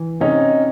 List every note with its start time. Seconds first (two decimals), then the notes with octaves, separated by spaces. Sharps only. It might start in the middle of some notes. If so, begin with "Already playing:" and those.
Already playing: E3
0.20 C3 C#4 D#4